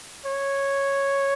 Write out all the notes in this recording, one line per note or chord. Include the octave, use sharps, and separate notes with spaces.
C#5